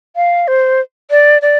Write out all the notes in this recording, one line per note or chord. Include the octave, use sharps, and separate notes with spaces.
F5
C5
D5
D5